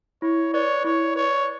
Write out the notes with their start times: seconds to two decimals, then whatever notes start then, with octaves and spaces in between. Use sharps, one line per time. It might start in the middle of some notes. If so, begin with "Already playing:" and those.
0.22 E4 C#5
0.54 B4 C#5 D5
0.84 E4 C#5
1.16 B4 C#5 D5